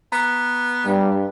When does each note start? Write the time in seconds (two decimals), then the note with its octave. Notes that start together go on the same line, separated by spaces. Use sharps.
0.12 B3 A#5
0.87 G2 G3